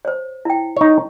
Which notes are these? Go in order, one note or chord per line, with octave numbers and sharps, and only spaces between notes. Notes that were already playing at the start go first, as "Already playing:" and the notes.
C5 C#5
E4 G5
D#4 C#5